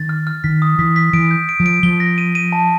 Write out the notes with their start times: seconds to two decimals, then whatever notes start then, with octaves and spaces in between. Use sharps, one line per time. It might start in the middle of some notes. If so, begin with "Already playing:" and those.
Already playing: D#3 A6
0.09 F6
0.27 F6
0.44 D#3 B6
0.62 D#6
0.79 E3 B6
0.96 B6
1.13 E3 D7
1.31 G6
1.49 D7
1.60 F3
1.66 D7
1.83 F3 G7
2.00 A#6
2.18 D#7
2.35 D#7
2.52 A5